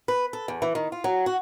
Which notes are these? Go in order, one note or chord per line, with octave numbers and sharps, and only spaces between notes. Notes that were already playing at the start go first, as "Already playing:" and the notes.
B4
A4
E2
E3
D#3
F4
F#3
F#4